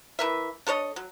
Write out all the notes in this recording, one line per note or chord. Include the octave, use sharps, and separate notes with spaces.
E3 A#4 E5
D4 A4 C#5 D#5
F#3